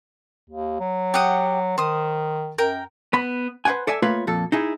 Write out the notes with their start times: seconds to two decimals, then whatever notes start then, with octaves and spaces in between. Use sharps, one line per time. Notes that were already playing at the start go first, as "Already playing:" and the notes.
0.50 D#2
0.80 F#3
1.14 G4 F#5 D#6
1.78 D#3 C5 D#6
2.58 F#2 A#4 G5
3.13 B3 B5
3.65 B4 C5 D5 F#5 G#5
3.87 A4 D5 E5 G#5
4.02 A3 A#3 F4 B4 C#5 F5
4.27 F2 A#2 A4
4.52 D#4 E4 G#4